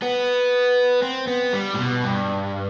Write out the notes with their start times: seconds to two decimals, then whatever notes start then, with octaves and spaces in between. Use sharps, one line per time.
0.02 B3
1.03 C4
1.27 B3
1.53 G3
1.74 A2
1.79 B2
2.04 G2